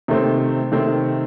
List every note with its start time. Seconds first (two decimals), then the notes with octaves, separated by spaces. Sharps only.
0.08 C3 D#3 A3 C4
0.72 C3 D#3 A3 C4